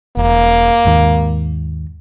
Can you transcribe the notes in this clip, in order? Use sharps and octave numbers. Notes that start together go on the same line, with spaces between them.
E1 A#3
D#2 G#2